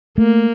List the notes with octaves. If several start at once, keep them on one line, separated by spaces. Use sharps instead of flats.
A3 A#3